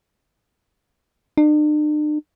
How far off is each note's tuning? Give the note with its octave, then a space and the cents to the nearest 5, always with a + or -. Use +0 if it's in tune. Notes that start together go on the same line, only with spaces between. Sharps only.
D4 +45